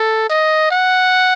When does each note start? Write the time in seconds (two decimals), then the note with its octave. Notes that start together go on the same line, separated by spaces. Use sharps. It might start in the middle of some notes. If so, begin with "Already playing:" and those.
Already playing: A4
0.30 D#5
0.71 F#5